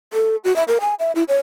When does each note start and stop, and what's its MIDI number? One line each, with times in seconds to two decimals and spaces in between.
0.13 0.36 69
0.44 0.55 66
0.56 0.63 76
0.68 0.78 70
0.81 0.94 80
0.99 1.12 76
1.15 1.23 64
1.28 1.38 73